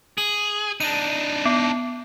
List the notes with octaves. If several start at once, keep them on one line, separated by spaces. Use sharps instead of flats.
G#4 F#7
D4 D#4 D#7
B3